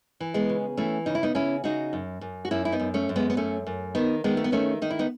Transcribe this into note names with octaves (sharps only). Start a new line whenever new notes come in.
E3
G#3 B3
C#3
E3 A3 C#4
C#3 D#4
E4
B3 D#4
C#3 C#4 E4
C#3 D#4 F#4
F#2
F#2
F#4
F#2 C#4 E4
E4
B3 D#4
F#2
A3 C#4
F#2
G#3 B3
B3
F#2 A3 C#4
F#2
D#3 B3 D#4
D#3 G#3 B3
A3
B3
D#3 A3 C#4
D#3 D#4
E4
B3 D#4